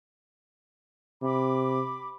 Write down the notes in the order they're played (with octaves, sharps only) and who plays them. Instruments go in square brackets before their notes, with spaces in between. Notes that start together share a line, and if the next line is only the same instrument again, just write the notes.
[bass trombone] C3 [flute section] B5 D6